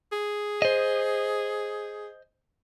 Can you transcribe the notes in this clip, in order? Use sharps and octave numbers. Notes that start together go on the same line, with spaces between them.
G#4
C5 D#5